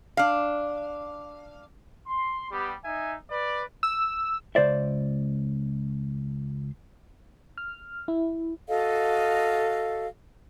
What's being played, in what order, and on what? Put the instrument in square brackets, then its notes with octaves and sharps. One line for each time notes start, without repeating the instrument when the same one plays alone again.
[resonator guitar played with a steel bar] D4 F5
[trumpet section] C6
G3 B3 G4
D#4 E5 G#5
B4 D5
[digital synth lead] E6
[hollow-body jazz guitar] C#2 C5 D5 E5
[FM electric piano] F6
E4
[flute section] F#4 A4 D#5 F5